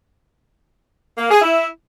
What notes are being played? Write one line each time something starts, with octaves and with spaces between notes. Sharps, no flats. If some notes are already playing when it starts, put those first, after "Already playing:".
A#3
G#4
E4